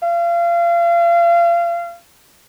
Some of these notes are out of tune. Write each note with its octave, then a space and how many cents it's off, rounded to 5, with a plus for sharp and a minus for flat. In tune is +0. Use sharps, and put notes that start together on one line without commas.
F5 -30